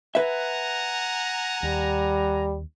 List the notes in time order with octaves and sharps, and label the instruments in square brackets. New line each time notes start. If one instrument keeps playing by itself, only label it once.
[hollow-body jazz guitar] B4 E5 [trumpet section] F#5 G#5 A#5
[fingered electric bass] D#2 [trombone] G3